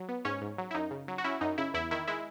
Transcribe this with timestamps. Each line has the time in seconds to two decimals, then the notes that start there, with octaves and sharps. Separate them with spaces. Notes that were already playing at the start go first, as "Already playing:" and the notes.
Already playing: F#3
0.09 B3
0.25 G#2 C#4 C#5
0.41 G#2
0.58 F#3
0.71 E4
0.74 F#2 D#4
0.91 C#3
1.08 F#3
1.18 F#4
1.24 C#4 E4
1.41 F#2 D#4
1.58 C#3 E4
1.74 E2 E4
1.91 D#3 E4
2.07 G#3 E4